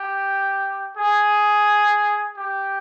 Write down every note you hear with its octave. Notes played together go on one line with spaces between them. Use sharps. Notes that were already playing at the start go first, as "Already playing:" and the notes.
Already playing: G4
G#4
G4